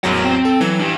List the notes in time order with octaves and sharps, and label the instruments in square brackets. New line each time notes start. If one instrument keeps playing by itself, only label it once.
[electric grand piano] A1 E2 F#3 [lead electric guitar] A#4 F#5
[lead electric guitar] C4
[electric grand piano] A4
[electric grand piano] E3 [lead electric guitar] F#3
[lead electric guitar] D4 G4